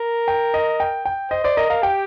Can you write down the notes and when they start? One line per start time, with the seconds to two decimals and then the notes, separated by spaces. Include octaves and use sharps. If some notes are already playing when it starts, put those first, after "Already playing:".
Already playing: A#4
0.28 G5
0.54 D#5
0.80 G5
1.05 G5
1.31 C5 D#5
1.44 C5 D5
1.57 A#4 D#5
1.69 A#4 F5
1.83 G4 G5